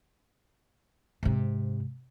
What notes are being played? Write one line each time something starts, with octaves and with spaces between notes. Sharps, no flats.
G#2 C3